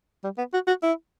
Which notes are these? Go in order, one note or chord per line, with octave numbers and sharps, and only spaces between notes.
G3
B3
F#4
F#4
E4